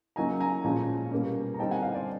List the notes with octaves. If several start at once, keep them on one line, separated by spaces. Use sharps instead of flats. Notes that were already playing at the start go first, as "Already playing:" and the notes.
C#3 F#3 A#3 D#4 G#5 A#5
G#5 A#5
A#2 F3 G#3 C#4
B2 G3 A#3 C#4
A#5
D3 G3 C4 D#4 G5 A5
F#5 G#5
D#5 F5
C5 D5